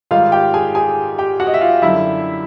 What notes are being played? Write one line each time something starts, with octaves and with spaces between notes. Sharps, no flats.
G#2 D#3 G3 F4 F5
G4 G5
G#4 G#5
G#4 G#5
G4 G5
F#4 F#5
D#5
E5
F4 F5
F#2 D3 G3 E4 E5